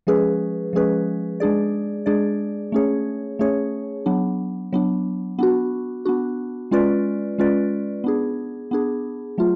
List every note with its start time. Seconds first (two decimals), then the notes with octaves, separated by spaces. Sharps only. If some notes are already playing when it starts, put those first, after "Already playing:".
0.07 F3 G#3 C#4 G#4 B4
0.73 F3 G#3 C#4 G#4 B4
1.40 G#3 D4 G#4 D5
2.06 G#3 D4 G#4 D5
2.72 A3 C#4 G#4 C#5
3.39 A3 C#4 G#4 C#5
4.06 F#3 B3 D4
4.73 F#3 B3 D4
5.39 B3 D4 F#4
6.05 B3 D4 F#4
6.71 G#3 C#4 F4 B4 D5
7.38 G#3 C#4 F4 B4 D5
8.04 B3 D4 G#4
8.71 B3 D4 G#4
9.38 F#3 A3 F4